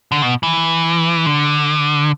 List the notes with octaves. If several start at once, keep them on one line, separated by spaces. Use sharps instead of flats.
D3
B2
E3
D3